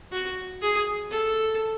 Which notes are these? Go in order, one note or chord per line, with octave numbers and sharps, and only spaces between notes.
F#4
G#4
A4